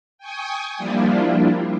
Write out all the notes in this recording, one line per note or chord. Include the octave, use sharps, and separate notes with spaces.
G5 G#5 C#6 D#6
F3 G3 A#3 D4 E4 F4